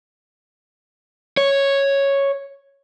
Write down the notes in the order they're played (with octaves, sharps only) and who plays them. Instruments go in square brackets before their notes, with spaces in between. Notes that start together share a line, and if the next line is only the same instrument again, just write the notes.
[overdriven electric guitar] C#5